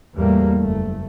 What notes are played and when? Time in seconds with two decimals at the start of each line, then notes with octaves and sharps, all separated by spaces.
0.15 E2 A2 G3 A3 A#3
0.60 F#1 A3